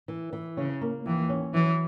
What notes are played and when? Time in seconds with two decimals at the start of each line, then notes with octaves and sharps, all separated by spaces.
0.08 E3
0.33 E3
0.57 C#3 C#4
0.81 A#3
1.06 D#2 E3
1.29 C#4
1.54 E3 F#3